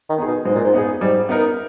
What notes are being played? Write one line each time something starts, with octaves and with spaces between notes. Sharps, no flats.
D#3
B3 D#4 G#4
B2
G#2 G#3
A#2
G#2
B3 D#4 G#4
G#2 G3
B3 D#4 A#4